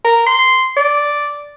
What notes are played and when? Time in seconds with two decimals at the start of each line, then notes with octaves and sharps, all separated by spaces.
0.05 A#4
0.26 C6
0.77 D5